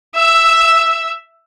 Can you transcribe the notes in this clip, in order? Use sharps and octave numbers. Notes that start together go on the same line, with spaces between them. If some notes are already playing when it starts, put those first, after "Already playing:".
E5 E6